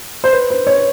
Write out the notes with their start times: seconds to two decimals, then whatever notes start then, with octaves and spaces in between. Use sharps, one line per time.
0.24 C5
0.33 B4
0.50 C5
0.67 C#5